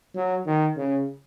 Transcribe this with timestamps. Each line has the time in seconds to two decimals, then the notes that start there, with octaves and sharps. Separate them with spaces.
0.15 F#3
0.46 D#3
0.77 C#3